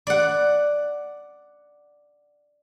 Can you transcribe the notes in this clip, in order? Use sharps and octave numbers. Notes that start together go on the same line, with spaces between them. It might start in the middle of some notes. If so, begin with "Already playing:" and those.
D5 F#5